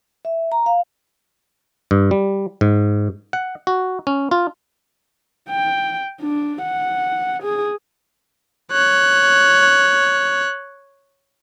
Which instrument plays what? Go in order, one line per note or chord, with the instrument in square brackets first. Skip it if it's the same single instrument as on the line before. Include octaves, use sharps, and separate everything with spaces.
[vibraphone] E5
A#5
F5
[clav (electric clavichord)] G2
G3
G#2
F#5
F#4
C#4
F4
[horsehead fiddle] G5
D4
F#5
G#4
[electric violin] C#5 F#6